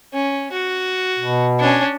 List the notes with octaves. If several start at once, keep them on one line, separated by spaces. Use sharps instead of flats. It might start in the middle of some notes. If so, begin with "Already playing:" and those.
C#4
F#4
B2
C#4 D4